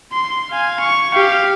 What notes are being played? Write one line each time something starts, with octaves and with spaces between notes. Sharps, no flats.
C6
F5 G#5
C#6
G4 F5